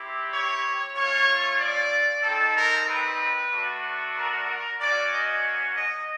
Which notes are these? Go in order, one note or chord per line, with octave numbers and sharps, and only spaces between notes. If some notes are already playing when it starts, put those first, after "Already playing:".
Already playing: C4 E4 G4
C#5
A3 C#4 F4 C#5
D5
G3 C4 D#4 A4
A#4
B4
A3 D4 F#4
A#4
A#3 C#4 F#4 D5
D#5
D#5